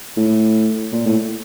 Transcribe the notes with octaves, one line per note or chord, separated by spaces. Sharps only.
A2
A#2
A2